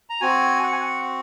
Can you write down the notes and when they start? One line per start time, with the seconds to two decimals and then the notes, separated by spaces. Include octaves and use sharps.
0.10 A#5
0.21 C4 F#4 G#5
0.63 F#5
0.72 G#5
0.80 F#5